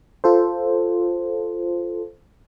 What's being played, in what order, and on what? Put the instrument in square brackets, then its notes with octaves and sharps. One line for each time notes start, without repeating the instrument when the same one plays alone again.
[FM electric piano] F4 A4 C5